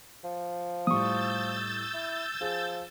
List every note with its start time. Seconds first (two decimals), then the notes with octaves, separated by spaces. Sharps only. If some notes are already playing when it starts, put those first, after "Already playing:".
0.24 F3
0.87 A2 G3 C#6 D#6 E6 G6 A6
1.94 E4
2.41 F3 G#4